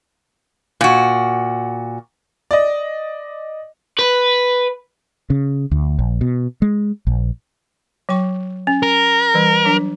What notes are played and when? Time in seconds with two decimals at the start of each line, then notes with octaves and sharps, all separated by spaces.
0.81 A#2 F#4
2.51 D5 D#5
3.99 B4
5.30 C#3
5.71 D2
5.99 A#1
6.21 B2
6.62 G#3
7.07 A#1
8.09 F#3 G5 C#6
8.67 C#4
8.83 A#4
9.34 E3 G3
9.65 F#3 D4